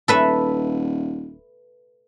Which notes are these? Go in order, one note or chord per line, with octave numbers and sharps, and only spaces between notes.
D#1 A4 B4 E5